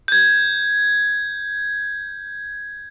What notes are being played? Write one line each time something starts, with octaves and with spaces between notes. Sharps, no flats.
G6 G#6